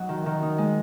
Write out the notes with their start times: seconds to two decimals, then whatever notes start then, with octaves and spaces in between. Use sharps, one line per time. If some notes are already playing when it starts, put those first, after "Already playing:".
Already playing: F#3 D#4 F#4
0.09 D#3
0.26 D#3
0.42 D#4
0.58 G#3